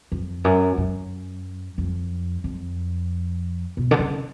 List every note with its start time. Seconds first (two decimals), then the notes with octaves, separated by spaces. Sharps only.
0.12 F2
0.44 F#2
0.77 F#2
1.78 F2
2.44 F2
3.77 B2
3.91 D3
3.99 C#3